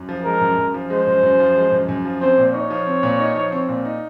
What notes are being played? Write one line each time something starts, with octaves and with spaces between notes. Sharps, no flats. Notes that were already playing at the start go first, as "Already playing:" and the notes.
Already playing: F#2
F3
G#3 A#4
F#2
F#2
F3
G#3 C5
F#2
F#2
F3
G#3
F#2
F#2
F3
C4 C5
A#2
D#4 C#5
F3
C4
A#2
D#4
F3
C4
A#2
D#4